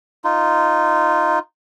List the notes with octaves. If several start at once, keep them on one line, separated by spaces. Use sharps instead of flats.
D#4 F4